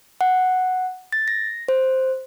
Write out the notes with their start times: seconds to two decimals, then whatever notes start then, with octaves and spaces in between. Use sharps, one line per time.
0.21 F#5
1.12 A6
1.28 A#6
1.68 C5